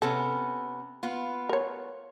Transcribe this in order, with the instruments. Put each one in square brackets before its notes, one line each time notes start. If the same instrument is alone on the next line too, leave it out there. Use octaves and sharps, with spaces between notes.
[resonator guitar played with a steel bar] C3 B3 C#4 [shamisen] A4
[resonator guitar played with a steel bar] B3 F4
[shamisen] A#4 C#5